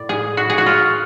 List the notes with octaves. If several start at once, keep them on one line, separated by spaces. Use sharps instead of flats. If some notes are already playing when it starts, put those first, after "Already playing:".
Already playing: A2 D5
G#4
F#4
G#4
F#4
F4